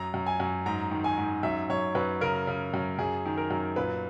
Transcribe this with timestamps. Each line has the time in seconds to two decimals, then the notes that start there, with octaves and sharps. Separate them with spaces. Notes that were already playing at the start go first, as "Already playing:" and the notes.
Already playing: F#2 A#5
0.14 F#2
0.26 G#5
0.40 F#2
0.66 G#2 A#5
0.91 D#3
1.04 G#5
1.17 G#2
1.43 F#2 E5
1.70 F#2 C#5
1.95 F#2 B4
2.21 C#3 A#4
2.47 C#3
2.74 F#2
2.99 F#2 G#4
3.25 D#3
3.37 A#4
3.50 F#2
3.76 A#2 B4